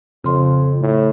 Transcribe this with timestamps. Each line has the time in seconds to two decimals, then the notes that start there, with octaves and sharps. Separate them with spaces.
0.25 F2 C#3 C6
0.81 A2